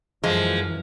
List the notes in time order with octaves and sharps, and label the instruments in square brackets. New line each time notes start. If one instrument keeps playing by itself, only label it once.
[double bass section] F#2 E3 [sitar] F3 [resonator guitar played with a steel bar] G#3